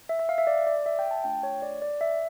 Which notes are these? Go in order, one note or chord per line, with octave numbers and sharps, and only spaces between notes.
E5
E5
F5
E5
D5
D5
E5
G5
A5
A3 D4 F4 G5
C#5
D5
D5
E5